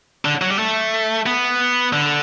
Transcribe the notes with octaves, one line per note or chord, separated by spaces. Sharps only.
D3
F#3
G3
A3
B3
D3